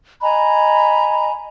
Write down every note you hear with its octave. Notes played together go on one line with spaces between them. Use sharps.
D#5 G#5 A#5 B5